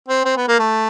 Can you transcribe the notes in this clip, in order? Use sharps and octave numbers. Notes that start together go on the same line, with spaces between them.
C4
C4
B3
A#3
A3